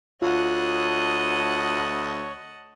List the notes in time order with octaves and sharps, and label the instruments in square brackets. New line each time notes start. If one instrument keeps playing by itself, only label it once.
[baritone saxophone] D2 [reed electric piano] F4 [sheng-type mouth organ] C#5 [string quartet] D#5 F#5 A5